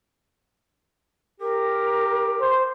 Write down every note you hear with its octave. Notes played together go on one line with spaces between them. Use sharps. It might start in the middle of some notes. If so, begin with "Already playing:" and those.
G4 A#4
C5